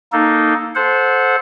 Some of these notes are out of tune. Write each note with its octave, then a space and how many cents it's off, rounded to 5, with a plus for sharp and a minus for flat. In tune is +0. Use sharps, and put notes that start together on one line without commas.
A#3 +0 D#4 +0 A4 +5
A4 -20 C5 +0 F#5 -20